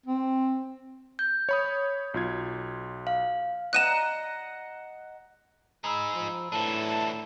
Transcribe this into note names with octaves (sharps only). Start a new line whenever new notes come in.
C4
G6
C#5 B5 D#6
B1 F4 G#6
F5
D#5 F#5 A#5 F#6 D#7 E7
D#4 G#4 A#5 B5 E6
F3
A2 E3 D4 A5 D#7